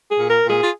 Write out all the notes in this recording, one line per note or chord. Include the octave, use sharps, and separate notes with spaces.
G#4
A#2
A#4
A#2
G#4
F4